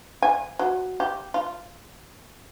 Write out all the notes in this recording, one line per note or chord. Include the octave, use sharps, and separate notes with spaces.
G#5
F#3
G4
F4